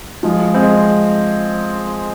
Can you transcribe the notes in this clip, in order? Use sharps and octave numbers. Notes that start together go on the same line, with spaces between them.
F3 G#3
G#3 C4